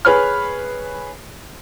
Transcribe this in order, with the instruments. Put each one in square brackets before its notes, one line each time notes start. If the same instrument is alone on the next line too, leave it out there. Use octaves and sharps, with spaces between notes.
[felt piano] G#4 B4 C#5 F6